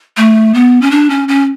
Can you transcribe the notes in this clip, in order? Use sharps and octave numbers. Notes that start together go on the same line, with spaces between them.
A3
B3
C#4
D4
C#4
C#4